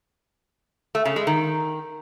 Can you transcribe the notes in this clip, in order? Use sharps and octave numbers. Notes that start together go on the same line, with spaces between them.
A3
C#3
G#3
D#3